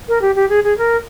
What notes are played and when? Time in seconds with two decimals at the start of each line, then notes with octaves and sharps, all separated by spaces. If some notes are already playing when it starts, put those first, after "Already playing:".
0.08 A#4
0.22 G4
0.36 G4
0.49 G#4
0.64 G#4
0.78 A#4